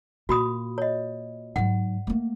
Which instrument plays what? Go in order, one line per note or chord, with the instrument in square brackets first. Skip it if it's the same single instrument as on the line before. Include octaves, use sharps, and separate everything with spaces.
[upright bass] A#2 [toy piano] F#4 B5 D#6
[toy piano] C#5 D#5
[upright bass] G#2 F#3 [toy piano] F#5
[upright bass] A3 A#3